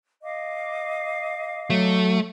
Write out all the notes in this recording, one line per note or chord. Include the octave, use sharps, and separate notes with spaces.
D#5 F5 D6
F#3 A3